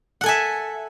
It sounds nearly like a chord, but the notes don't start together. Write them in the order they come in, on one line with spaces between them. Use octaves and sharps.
F#5 A4 G#5 E5